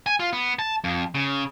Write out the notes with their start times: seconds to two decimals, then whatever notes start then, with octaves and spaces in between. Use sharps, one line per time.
0.06 G#5
0.20 F4
0.33 B3
0.59 A5
0.84 F2
1.15 C#3